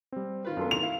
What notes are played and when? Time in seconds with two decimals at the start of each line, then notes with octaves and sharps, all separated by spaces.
0.12 G3 C4
0.45 D#3 F4 B4
0.57 F#2 B3 D4 F4 A4 C6
0.71 A2 D#3 C4 F7
0.83 E4 F5